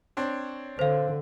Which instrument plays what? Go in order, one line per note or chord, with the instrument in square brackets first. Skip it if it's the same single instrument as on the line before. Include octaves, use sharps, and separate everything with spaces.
[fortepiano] C4 D4 C#5
[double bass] D3 [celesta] C5 F5